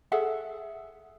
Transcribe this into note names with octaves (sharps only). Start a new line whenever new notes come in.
G#4 A4 E5 F#5